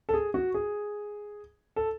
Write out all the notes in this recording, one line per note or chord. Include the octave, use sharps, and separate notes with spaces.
A4
G#4
F#4
G#4
A4